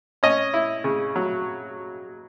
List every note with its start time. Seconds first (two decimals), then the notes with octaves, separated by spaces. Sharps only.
0.23 C#4 D#5
0.54 E4
0.84 C#3
1.16 F#3